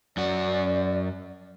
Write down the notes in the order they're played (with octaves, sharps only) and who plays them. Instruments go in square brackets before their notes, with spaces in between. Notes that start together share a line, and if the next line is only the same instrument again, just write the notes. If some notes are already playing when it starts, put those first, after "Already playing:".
[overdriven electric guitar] F#2 F#4 [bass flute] D5